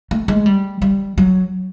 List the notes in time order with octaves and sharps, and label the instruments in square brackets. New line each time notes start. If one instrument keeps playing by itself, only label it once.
[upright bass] A3
G#3
G3
G3
F#3